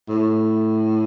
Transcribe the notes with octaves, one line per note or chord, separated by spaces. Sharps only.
A2